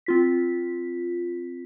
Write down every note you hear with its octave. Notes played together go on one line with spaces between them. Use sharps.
C4 F4 B6